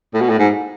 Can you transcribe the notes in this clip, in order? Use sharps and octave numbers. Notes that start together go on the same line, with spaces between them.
A2
B2
A2
G#2